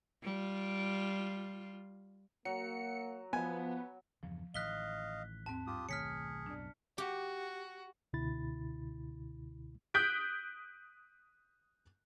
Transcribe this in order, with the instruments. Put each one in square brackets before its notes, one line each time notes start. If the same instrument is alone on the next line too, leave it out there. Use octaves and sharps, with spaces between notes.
[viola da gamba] G3 F4
[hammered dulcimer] F#3 [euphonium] A#3 [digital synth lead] C#7
[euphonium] F3 [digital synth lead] B3 [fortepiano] G#5
[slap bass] E2 G2 C#3 [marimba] F3
[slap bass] A1 A2 D#3 [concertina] D#5 F5 [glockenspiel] F#6 B6 G7
[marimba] D#2 G#2 C4 [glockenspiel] A5
[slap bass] G2 [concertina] F4 G4 D#6
[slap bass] B1 D#3 A3 [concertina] G#4 [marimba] C#5 [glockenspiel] F6 B6 C#7
[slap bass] B1 F#2 A2 [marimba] D4 D5
[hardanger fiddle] F#4 [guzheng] G4
[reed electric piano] C#2 B2 D3 E4 B5 A6
[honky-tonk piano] D#6 F#6 G6 B6 D7